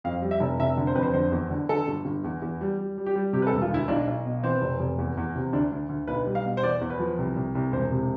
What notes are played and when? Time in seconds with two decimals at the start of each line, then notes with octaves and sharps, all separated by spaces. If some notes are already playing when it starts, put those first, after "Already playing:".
0.04 F2 F5
0.22 G3
0.31 E5
0.40 F1
0.59 F1 E5
0.77 D3
0.87 C5
0.95 F2 B4
1.03 C5
1.14 D3 C5
1.32 E2
1.50 D3
1.69 D3 A4
1.88 G1
2.05 G1
2.24 E2
2.42 E2
2.61 G3
2.78 G3
2.98 G3
3.06 G4
3.16 G3
3.33 C3 G4
3.42 B4
3.47 A4
3.53 E1
3.62 F4
3.71 D2 E4
3.88 B1 D4
4.07 B1
4.26 B2
4.43 E3 C4
4.62 F1
4.80 F1
4.98 E2
5.17 E2
5.36 C3
5.53 D2 D4
5.72 D2
5.89 D2
6.07 B1 B4
6.26 G3
6.35 F5
6.45 B2
6.57 C5
6.62 E2 D5
6.81 E2
6.90 B4
6.99 F3
7.18 C2
7.36 C2
7.55 C2
7.72 E1 C5
7.91 C3